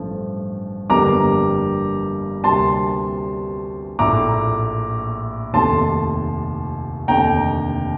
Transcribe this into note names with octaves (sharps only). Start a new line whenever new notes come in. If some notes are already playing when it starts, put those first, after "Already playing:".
Already playing: A1 G2 F3 A3
G1 F2 D3 G3 A#3 A#5 D6
D2 C3 G3 A#3 A5 C6
A#1 A2 A3 A#5 D6
F1 D#2 D#3 A3 A5 C6
F1 D#2 D3 A3 G5 A#5